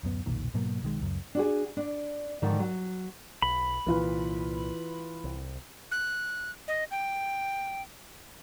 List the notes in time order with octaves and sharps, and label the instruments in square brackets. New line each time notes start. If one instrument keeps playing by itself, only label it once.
[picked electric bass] D1 F#2 B3
F1 B1 A#2 D#3
G#2 B2 F#3 A#3
B1 D#3 G#3
C#2 F#2
[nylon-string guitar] D4 F#4 G#4
D4
G#2 D3 D#3 F3 D#4
F#3
[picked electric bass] B1 [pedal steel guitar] B5
[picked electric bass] C2 A#2 [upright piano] E3 F4 B4
[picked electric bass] C2
[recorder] F#6
D#5
G5